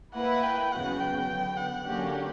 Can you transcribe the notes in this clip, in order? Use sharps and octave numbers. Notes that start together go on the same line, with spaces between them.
A#3 E4 B4 F#5
G5
E2 C#3 F#3 B3 F#4 F#5
G5
D3 F#3 B3
F#5
D3 F#3 A#3 C#4 G4